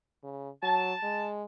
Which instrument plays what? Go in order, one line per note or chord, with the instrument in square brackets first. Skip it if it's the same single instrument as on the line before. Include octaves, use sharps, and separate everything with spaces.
[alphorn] C#3
[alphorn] F#3 [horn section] A5
[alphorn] G#3